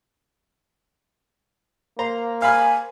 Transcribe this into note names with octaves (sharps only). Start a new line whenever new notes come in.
A#3 C5 A#5
F5 G#5 B5 F6